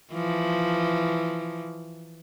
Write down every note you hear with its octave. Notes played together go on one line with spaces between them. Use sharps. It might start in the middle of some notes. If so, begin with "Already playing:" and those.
E3 F3